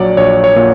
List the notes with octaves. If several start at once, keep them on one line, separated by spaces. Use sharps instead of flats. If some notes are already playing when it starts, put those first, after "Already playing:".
Already playing: A#1 F#3 C#5 D5
A#1 C#5
C#5
A#2